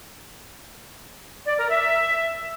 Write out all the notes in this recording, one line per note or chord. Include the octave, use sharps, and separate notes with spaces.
D5
A#4
E5